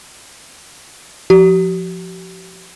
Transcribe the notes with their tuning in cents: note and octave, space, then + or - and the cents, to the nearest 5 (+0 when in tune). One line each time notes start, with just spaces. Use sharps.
F3 +0 G4 -45